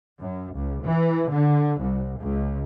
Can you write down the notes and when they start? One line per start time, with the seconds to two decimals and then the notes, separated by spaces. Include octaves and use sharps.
0.21 F#2
0.55 C#2
0.84 E3
1.31 D3
1.80 C2
2.19 C#2